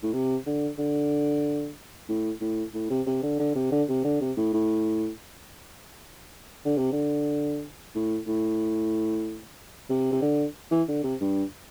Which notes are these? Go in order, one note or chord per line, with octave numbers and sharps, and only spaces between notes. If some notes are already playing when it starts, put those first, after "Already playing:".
A2
C3
D3
D3
A2
A2
A2
C3
C3
D3
D3
C3
D3
C3
D3
C3
A2
A2
D3
C3
D3
A2
A2
C3
C3
D3
E3
D3
C3
G2